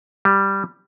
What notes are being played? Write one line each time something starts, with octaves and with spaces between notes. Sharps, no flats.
G3